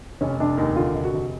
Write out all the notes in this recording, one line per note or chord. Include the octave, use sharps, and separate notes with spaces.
F1 C#4
F1 D4
D#2 D#4
D3 F4
F1
F#4
F1